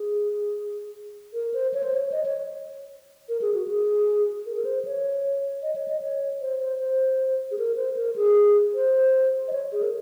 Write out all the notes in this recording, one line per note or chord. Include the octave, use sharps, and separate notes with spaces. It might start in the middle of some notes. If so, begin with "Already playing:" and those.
Already playing: G#4
A#4
C5
C#5
C5
C#5
D#5
C#5
A#4
G#4
F#4
G#4
A#4
A#4
C5
C#5
D#5
C#5
D#5
C#5
C5
C5
C5
G#4
A#4
C5
A#4
G#4
C5
D#5
C#5
G#4
A#4